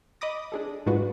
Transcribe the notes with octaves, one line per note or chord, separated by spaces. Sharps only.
D#5 B5 D6 D#6 A#6
D4 G#4 A4
G#2 G#3 D4 F4 F#4 B4